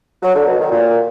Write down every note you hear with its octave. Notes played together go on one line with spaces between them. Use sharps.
F#3
D3
B2
D#3
A#2